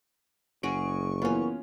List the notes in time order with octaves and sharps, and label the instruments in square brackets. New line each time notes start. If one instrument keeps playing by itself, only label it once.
[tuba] F#1 [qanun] C#4 F#4 G#4 [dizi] C#6 [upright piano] D7 D#7
[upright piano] E3 A#3 B3 [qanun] C#4 F4